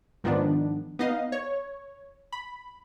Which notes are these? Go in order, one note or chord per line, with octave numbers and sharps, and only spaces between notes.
G#2 D#3 F3 B3 D4
B3 D#4 D#5 F5
C#5
B5